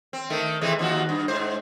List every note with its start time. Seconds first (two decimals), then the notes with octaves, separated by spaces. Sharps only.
0.13 C4
0.30 D#3 A3
0.61 C3 E3 G#3
0.79 D#2 F3 F#4
1.09 G2
1.28 G#2 C5